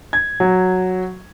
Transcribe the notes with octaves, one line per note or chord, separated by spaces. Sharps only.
G#6
F#3